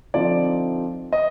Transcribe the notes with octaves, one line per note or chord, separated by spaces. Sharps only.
D3 F3 C4 D#4 D5
D#5